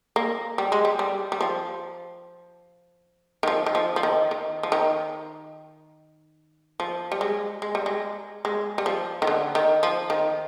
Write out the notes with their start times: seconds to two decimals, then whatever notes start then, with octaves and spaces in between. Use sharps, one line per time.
0.16 A#3
0.58 G3
0.72 G#3
0.85 G3
0.99 G3
1.32 G3
1.41 F3
3.43 D#3
3.47 F3
3.66 D#3
3.75 F3
3.96 F3
4.03 D#3
4.31 D#3
4.63 F3
4.72 D#3
6.80 F3
7.12 G3
7.21 G#3
7.62 G#3
7.75 G3
7.86 G#3
8.45 G#3
8.78 G3
8.86 F3
9.22 D#3
9.27 D3
9.55 D#3
9.83 F3
10.10 D#3